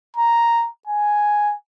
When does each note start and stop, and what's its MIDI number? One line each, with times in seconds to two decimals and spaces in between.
0.17 0.69 82
0.87 1.54 80